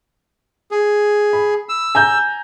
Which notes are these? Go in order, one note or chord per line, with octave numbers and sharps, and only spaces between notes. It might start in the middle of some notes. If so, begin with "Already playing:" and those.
G#4
B5
E6
G#5 A#5 G6